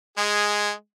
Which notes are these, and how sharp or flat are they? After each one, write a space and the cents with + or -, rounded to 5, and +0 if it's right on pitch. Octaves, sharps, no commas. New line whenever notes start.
G#3 +0 G#4 -5